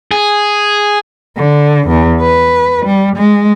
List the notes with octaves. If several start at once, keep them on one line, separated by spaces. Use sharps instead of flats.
G#4
D3
E2
B4
G3
G#3